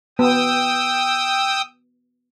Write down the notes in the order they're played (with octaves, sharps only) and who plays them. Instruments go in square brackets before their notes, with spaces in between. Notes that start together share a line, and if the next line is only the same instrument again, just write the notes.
[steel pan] B3 [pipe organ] G5 D#6 E6